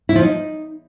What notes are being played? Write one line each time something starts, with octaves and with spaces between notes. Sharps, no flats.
E4
F3
D#4